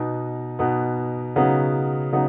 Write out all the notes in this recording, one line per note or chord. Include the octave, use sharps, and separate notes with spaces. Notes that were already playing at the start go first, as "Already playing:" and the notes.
Already playing: B2 B3 D#4
B2 B3 D#4
C#3 F#3 B3 D#4
C#3 F#3 B3 D#4